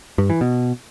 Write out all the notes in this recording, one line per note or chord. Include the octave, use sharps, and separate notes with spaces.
G2
E3
B2